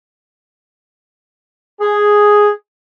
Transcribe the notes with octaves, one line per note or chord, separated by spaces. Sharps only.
G#4